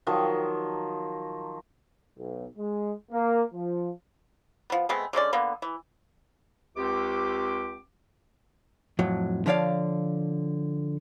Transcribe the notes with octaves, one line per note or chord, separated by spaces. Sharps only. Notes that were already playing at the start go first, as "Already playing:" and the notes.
D#3 F3 F#3
B1
G#3
A#3
F3
F3 B3
G#3 A3 B3 C4
D3 G#3 C#4 D5
D3 A#3 B3
E3
C#2 C4 G4 D6
F2 A2 F#3
D3 F3 C#5 D5 F5